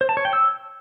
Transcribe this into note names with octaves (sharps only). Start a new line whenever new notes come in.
C5
A5
C#5
G5
E6